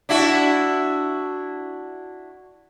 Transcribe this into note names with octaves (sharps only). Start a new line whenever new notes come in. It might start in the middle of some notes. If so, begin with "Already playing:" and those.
D4 E4 F#4